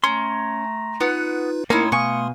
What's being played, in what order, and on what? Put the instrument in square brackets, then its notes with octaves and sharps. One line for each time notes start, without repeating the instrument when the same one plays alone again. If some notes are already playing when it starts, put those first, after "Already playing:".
[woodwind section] A3 A#5 [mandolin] C#4 [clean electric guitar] C6
[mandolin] B3 F#5 [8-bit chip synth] D#4 F4 B4
[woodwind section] A2 [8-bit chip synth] A3 C6 [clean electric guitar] A#3 [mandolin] C#4 D#4 E4
[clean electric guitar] B2 G#5 [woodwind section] F5 D#6 [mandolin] C#6